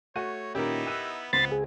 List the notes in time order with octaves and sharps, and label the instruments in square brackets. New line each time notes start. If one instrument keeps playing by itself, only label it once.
[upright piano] A3 F#4 [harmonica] C#5 [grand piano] D#7
[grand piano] A#2 D#3 C#4 [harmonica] B3 D#4 E4 [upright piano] G4 A#4
[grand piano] E6 F#6 D#7
[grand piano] C#2 [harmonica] B3 [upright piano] C4 [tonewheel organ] B5 C6 A6
[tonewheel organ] G#4